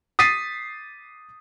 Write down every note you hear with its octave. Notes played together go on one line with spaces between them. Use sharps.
D#6 A6 B6 C7 D#7